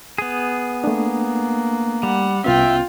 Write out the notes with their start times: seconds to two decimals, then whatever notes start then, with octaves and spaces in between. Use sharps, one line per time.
0.18 B3 G#4
0.84 A3 A#3 D4
2.03 G3 F#5
2.44 C2 B3 C#4 F4 E5 G5